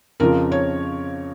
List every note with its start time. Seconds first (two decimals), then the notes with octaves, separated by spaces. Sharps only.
0.20 F2 C#3 F3 A#4
0.52 C#5